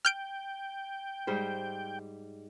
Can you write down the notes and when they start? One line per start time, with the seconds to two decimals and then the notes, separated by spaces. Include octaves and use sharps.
0.05 G5 F6 G6 D7
1.27 G#2 G3 C5